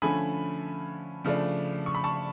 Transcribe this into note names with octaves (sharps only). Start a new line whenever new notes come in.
D3 F3 A3 C#4 G#5 B5
C#3 F3 A3 D4
C#6
B5
A5 C#6